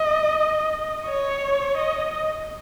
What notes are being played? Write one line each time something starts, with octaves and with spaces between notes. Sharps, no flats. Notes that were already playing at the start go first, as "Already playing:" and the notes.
Already playing: D#5
C#5
D#5